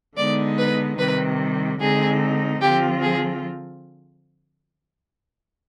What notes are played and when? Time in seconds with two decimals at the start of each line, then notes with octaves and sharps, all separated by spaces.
0.17 D3 G#3 B3 D#4 D5
0.58 B4
0.99 C3 D#3 G3 B4
1.80 D3 G#3 C4 D#4 G#4
2.61 D3 F3 C4 F4 G4
3.02 G#4